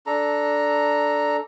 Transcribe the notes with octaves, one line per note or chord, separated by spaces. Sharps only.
D4 A4 A#5